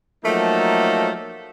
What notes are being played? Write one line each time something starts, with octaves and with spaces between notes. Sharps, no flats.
F3 F#3 A3 A#3 D#4 A4